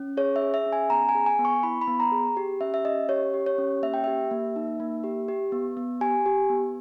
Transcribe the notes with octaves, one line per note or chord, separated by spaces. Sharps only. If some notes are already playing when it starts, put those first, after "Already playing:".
Already playing: C#4
G#4 C#5
E5
G#4
E5
C#4
G#5
B3 A#5
G#5
G#4
G#5
B3
C#6
E4 B5
B5
B3
A#5
G#4
G4
C#4 E5
E5
C#4 D#5
G4 C#5
G4
C#5
C#4
A#3 E5
G5
G4 E5
A#3
D#4
A#3
G4
G4
B3
B3
G4 G#5
G4
B3